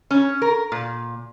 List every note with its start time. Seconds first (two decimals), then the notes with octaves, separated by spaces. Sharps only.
0.11 C#4
0.42 A#4
0.72 A#2